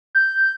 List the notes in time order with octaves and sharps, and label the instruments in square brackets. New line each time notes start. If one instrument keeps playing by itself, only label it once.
[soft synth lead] G6